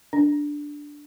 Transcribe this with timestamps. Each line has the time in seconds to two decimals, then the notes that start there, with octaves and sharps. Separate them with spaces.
0.13 D4